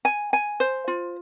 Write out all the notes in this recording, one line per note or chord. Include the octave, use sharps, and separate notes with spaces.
G#5
G#5
C5
F4